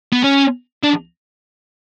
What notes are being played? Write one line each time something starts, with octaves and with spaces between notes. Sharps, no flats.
B3
C#4
D4